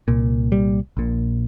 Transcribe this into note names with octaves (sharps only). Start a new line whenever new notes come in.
C2 A#2
G3
A#1 A#2